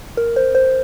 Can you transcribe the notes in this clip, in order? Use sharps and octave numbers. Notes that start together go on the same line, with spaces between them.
A#4
C5
C5